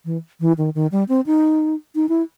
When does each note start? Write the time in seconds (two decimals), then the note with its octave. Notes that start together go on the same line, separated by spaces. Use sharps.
0.05 E3
0.40 E3
0.58 D#3
0.75 D#3
0.92 G3
1.09 C4
1.26 D#4
1.95 D#4
2.09 E4